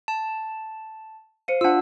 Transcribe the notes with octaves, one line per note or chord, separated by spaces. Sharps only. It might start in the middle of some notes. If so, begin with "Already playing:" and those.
A5
C5 F5 C#7 D#7
D4 F4 F#5 E6